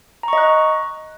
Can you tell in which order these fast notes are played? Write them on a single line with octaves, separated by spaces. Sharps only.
A#5 C#6 D#5 F#6